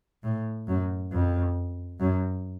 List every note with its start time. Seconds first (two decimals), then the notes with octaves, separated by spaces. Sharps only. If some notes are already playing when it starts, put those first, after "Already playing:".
0.23 A2
0.67 F#2
1.12 F2
2.00 F#2